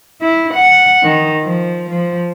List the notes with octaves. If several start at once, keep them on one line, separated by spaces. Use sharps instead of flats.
E4
F#5
D#3
F3
F3